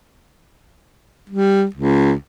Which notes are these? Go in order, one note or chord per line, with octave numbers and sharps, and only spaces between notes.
G3
C#2